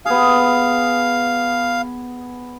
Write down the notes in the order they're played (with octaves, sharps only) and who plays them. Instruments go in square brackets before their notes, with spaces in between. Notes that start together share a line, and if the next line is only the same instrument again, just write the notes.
[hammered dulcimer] B3 G#4 [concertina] F5